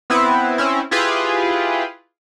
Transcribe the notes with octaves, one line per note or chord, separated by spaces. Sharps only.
B3 C4 E4 B4
C4 C#4 E4
E4 F4 G4 G#4 B4